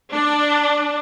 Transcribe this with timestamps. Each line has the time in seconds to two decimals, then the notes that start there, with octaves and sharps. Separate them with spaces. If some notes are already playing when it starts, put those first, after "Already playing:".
0.14 D4